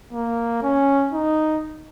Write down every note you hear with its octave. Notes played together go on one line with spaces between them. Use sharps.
A#3
C#4
D#4